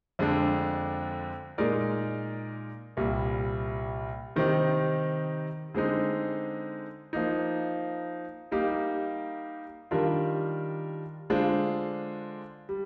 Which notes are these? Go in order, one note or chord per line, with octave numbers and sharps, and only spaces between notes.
F2 D3 G#3 D4
A#2 G#3 D#4 A#4 D5
C2 A#2 G3
C3 D#3 G3 C4 D#4
D3 G#3 C4 D#4
F3 A#3 D#4
G3 A#3 D#4 G4
D#3 G3 D4 F4 A#4
D3 G#3 D4 F4 C5
G3